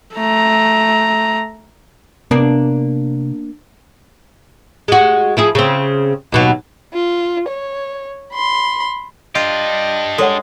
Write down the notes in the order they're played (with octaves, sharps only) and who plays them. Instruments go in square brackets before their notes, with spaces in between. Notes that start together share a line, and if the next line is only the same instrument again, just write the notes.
[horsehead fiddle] A3 A#5
[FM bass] C3 [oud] A#3 D4 [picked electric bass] B3
[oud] G#3 F#4
F3 E4 G#4
C#3 C4
D#2 B2 F#3
[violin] F4
C#5
B5 C6
[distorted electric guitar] D4 G4 [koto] F4 [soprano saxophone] D#5
[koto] G#3 [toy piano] A4 C#5 F#5